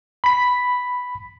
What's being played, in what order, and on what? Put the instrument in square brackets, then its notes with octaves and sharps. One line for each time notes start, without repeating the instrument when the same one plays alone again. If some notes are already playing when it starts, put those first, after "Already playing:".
[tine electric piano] B5 B6